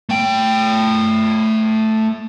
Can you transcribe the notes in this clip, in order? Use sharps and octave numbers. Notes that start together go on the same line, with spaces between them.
A3 G5